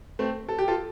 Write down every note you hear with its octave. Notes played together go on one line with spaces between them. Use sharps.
A3 C4
A4
G4
F4 A4